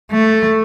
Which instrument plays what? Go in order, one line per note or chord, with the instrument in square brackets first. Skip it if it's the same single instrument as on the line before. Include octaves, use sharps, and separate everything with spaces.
[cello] A3